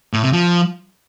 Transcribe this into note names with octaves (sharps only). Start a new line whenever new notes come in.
A2
C3
F3